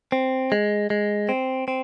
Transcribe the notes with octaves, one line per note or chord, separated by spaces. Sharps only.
C4
G#3
G#3
C4
C4